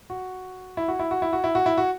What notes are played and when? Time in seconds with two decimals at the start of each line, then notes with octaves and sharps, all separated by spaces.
0.10 F#4
0.77 E4
0.88 F#4
0.99 E4
1.11 F#4
1.22 E4
1.33 F#4
1.44 E4
1.55 F#4
1.66 E4
1.77 F#4